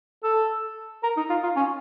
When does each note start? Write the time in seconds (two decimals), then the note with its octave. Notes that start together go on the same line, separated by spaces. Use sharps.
0.23 A4
1.03 A#4
1.17 D#4
1.30 F4
1.43 F4
1.56 C#4